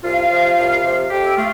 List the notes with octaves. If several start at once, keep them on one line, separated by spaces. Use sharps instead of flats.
C2 F4 F5
C3 F3
C2
C3 F3
F2 G4 G5
E5
A3 F4 F5